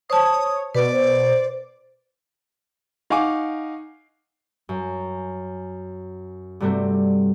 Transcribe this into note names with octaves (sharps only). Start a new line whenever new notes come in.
C5 C#5 A5 D#6
B2 B4 D5
C5
D#4 F5 F#5 G#5 C#6 D6
F#2
G2 C3 G3 A3 C4 F#4